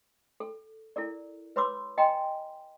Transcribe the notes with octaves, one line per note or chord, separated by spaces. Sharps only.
A4
E4 A4 A#4 D5
B4 C#5 B5 C6 D6 E6
D#5 G5 G#5 A#5 C6